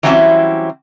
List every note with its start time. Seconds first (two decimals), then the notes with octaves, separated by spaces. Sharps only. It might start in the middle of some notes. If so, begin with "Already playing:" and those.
0.03 E3 F#3 G3 C4 C#4 E4